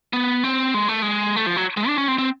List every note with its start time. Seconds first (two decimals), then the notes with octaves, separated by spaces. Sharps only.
0.13 B3
0.44 C4
0.74 G#3
0.88 A3
1.02 G#3
1.36 A3
1.46 F3
1.57 F#3
1.77 G#3
1.88 D4
1.98 C#4
2.08 C4
2.18 C4